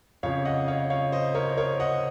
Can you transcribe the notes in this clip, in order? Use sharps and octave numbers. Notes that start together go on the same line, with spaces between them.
F2 C#3 F3 C#5 F5
D#5 F#5
C#5 F5
C#5 F5
C5 D#5
A#4 C#5
A#4 C#5
D#5 F#5